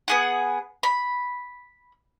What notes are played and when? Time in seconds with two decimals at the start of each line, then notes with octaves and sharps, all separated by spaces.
0.08 B3 G#4 F#5
0.83 B5